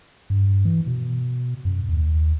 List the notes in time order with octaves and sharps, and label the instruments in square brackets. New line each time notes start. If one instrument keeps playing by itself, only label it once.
[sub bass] G2
E3
B2
F#2
D#2